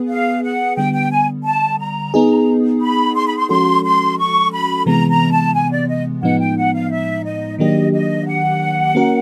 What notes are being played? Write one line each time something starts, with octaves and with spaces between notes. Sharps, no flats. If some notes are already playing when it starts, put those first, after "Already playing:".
Already playing: B3 G#4 B4
F5
F#5
D3 G3 B3 G5
G5
G#5
A5
A#5
B3 D#4 G#4
B5
C6
B5
C6
F3 G#3 C#4 F#4 A4 C6
C6
C#6
B5
C3 E3 G#3 B3 A#5
A#5
A5
G#5
D5
D#5
A2 F3 G#3 B3 D#4 F#5
G5
F#5
F5
E5
D#5
D#3 F#3 A#3 D4 G4 D#5
D#5
F#5
A#3 C#4 F#4 A#4